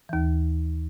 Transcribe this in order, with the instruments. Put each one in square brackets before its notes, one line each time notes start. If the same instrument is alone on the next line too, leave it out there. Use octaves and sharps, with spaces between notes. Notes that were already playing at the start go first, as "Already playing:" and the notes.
[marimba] D#2 E3